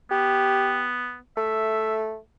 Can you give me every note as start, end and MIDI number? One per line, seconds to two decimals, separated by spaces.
0.11 1.18 59
0.11 0.87 67
1.37 2.18 57
1.37 1.98 76